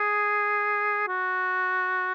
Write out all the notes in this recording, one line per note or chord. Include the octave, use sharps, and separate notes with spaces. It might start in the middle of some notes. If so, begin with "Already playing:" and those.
Already playing: G#4
F#4